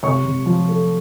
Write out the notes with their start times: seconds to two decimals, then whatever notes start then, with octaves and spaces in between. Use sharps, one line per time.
0.03 C3 C#5 C#6
0.25 C3
0.46 F3
0.68 A3